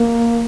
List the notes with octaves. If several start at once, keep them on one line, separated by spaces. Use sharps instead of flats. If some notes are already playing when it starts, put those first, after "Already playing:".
Already playing: A#3